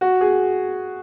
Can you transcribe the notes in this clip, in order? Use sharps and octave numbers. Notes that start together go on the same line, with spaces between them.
F#4
G#4